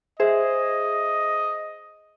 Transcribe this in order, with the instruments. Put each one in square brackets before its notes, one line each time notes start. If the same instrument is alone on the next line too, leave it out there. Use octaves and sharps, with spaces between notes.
[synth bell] G#4 C5 E5 [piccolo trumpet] D#5